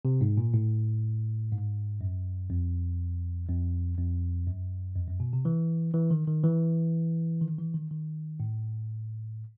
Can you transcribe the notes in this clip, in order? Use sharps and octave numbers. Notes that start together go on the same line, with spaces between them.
C3
G#2
A#2
A2
G#2
F#2
F2
F2
F2
F#2
F2
F#2
B2
C3
E3
E3
D#3
D#3
E3
D#3
E3
D#3
D#3
A2